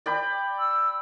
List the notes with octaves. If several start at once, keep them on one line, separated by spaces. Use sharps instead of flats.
D5 G5 B5
E6